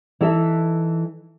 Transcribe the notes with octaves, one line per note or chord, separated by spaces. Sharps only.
E3 D#4 A4 E5